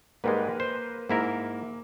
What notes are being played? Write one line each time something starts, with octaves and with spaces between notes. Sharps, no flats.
G#2 G3 G#3 A#3 A#4 B4
C5
G#2 A#3 E4 A#4